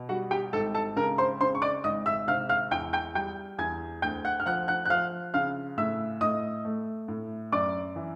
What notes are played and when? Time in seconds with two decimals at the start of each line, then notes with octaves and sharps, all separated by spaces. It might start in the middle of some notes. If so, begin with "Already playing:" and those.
Already playing: B2
0.09 G3 F#4 F#5
0.31 G4 G5
0.53 G#1 A4 A5
0.75 A4 A5
0.96 C#3 A#4 A#5
1.18 C5 C6
1.41 C#3 C5 C6
1.55 C#6
1.62 D5 D6
1.84 G#1 D#5 D#6
2.06 E5 E6
2.28 C3 F5 F6
2.49 F5 F6
2.71 E2 G5 G6
2.93 G5 G6
3.15 G3 G5 G6
3.58 E2 G#5 G#6
4.02 D2 G5 G6
4.25 F#5 F#6
4.40 F6
4.46 F3 F#5 F#6
4.68 F#5 F#6
4.85 F#6
4.90 F3 F5 F6
5.34 C#3 F5 F6
5.78 A2 E5 E6
6.21 A2 D#5 D#6
6.65 A3
7.08 A2
7.52 F#2 D5 D6
7.96 E3